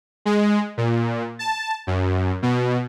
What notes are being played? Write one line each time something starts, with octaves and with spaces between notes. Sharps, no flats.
G#3
A#2
A5
F#2
B2